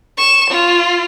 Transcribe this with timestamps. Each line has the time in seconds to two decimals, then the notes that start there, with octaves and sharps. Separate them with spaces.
0.17 C#6 E7
0.50 F4